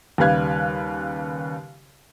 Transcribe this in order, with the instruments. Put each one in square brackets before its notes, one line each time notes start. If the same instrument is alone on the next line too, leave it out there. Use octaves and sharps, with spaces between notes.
[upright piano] D#2 C#3 G3 B4 F5 G#6